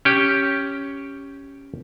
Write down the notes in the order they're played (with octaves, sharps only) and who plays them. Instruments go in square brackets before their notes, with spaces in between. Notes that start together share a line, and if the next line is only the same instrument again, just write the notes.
[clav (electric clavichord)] C#4 G4